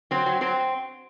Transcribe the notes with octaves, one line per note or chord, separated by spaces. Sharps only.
F#3 C4
F#3
F#3 C4